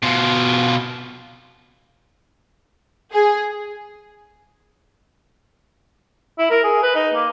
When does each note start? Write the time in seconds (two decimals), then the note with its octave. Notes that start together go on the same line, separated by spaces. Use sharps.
0.03 B2 F4
3.13 G#4
6.39 E4
6.51 A#4
6.64 G#4
6.83 B4
6.95 D#4
7.14 A#3